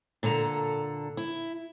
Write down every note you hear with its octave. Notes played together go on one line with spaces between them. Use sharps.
A#2 D3 A4 A#5
E4